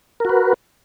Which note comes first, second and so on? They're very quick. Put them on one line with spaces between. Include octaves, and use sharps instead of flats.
A#4 F#4 B4